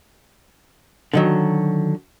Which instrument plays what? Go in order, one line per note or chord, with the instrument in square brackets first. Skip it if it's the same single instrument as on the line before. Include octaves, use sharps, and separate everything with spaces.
[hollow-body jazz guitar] D3 D#3 F#3